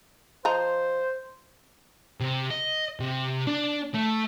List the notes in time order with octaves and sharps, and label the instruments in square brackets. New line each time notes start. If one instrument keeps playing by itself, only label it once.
[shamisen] F3 D#5 A#5 [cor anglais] C5
[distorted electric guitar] C3
D#5
C3
D4
A3